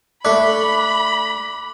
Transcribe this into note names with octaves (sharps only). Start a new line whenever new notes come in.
A3 D4 B5 D6 F#6 B6